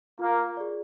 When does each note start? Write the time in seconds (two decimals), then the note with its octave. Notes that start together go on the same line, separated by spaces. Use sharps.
0.19 A#3 F4
0.57 G#4 D5